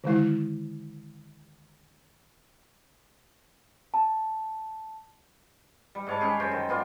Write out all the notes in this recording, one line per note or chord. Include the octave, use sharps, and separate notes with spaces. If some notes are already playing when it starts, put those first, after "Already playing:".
D3 D#3 G#3 E4
A5
G3
G#2 C#5 A5
C#4 G4 G#4
F#2 C5 G5
D#3
B3 F4 D5